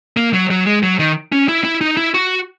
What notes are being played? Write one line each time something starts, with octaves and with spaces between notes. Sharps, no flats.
A#3
F#3
F#3
G#3
F#3
D#3
C#4
E4
E4
D#4
E4
F#4